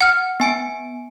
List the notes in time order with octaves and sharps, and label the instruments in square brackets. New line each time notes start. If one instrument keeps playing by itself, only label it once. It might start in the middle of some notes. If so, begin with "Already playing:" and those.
[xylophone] F#5 F6
[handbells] B3 G#5 D7